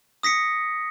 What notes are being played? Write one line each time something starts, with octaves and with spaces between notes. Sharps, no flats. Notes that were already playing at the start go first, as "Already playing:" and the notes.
D#6 A#6 B6 C#7